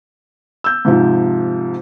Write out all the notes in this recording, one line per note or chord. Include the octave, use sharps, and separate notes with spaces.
E6 G6
G#2 C3 F3